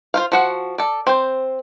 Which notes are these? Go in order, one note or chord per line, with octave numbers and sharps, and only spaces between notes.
F4 C5 F5
F3 F#4 F#5
A4 D5
C4 C5